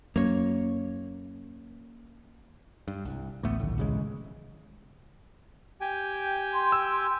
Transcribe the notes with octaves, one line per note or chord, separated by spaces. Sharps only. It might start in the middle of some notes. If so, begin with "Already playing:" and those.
F#2 A#3 C#5
G2
C2
A1 D2 A3 B3
D1 A#1 A2 D#3
A1 C#3 G#3
G4 G5 G#5
C6
E6